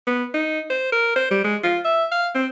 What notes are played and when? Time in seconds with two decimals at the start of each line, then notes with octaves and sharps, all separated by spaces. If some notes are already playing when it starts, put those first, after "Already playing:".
0.07 B3
0.34 D#4
0.70 C5
0.92 A#4
1.16 C5
1.31 G3
1.44 G#3
1.63 F4
1.84 E5
2.11 F5
2.35 C4